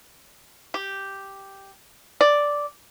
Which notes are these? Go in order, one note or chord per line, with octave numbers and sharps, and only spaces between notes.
G4
D5